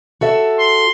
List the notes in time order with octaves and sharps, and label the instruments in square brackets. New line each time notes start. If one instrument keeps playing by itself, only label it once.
[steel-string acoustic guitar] F#4 A4 E5
[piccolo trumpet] C6